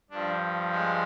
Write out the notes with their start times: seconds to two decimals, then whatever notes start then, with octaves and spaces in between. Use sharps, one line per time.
0.10 G2 F3 D4
0.71 G#3 G#4